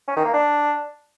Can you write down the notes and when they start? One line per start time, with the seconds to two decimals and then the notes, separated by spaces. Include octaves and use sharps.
0.08 C#4
0.16 D#3
0.25 A#3
0.34 D4